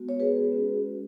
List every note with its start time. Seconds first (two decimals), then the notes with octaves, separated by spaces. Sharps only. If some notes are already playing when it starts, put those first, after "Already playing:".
Already playing: G#3 B3 F#4
0.09 C#5
0.20 G#4 B4
0.51 G#3 C#4 F#4